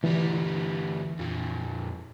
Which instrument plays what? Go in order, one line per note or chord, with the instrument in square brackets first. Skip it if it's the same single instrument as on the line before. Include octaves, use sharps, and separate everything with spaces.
[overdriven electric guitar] D2 G3 [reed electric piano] E3
[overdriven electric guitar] F2 A#2